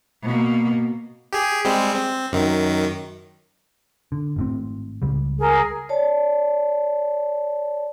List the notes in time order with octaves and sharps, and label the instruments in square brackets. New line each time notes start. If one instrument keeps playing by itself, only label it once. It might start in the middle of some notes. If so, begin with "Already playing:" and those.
[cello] B2 A#3
[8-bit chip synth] G4 G#4
G3 G#3 C4
C4
F#2 D#3
[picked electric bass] D3
G#1 A2 C4
C#2 G3
[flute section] G#4 A#4
[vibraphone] C#5 D5 A5